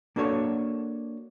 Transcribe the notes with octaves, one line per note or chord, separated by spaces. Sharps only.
A#3 D4 F#4 A4 C#5